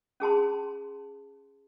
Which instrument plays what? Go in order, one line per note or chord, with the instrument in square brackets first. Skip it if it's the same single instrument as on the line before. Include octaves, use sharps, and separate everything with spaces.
[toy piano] C#4 G#4 A5 C6